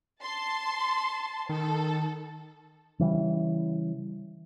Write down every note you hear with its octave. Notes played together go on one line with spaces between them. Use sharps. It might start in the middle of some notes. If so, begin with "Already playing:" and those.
A5 C6
D#3 A4
C#3 E3 G3